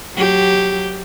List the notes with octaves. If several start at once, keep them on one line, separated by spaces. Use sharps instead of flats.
F#3 G4